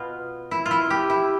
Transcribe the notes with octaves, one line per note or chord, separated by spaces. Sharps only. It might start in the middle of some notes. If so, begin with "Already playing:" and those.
Already playing: B2 B3 F4
E4
F4
E4
G4
E4